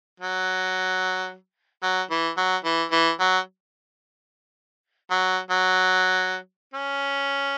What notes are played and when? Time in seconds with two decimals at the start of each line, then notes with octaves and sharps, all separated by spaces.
0.20 F#3
1.83 F#3
2.11 E3
2.37 F#3
2.64 E3
2.92 E3
3.20 F#3
5.10 F#3
5.50 F#3
6.73 C#4